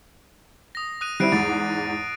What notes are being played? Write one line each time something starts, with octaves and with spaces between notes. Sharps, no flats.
D#6 A#6
D#6 F#6 D#7
G3 C4 E4 F#6 C7 D7
E2 G#2 A6